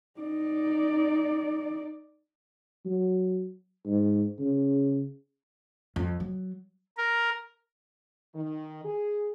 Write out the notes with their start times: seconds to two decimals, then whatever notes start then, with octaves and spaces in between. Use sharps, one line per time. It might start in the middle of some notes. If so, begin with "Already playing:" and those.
0.20 D#4 D5
2.86 F#3
3.86 G#2
4.39 C#3
5.96 F2
6.20 F#3
6.97 A#4
8.34 D#3
8.84 G#4